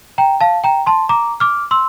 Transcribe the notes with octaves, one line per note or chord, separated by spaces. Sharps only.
G5 A#5
F5 A5
G5 A#5
A5 C6
A#5 D6
D6 F6
C6 E6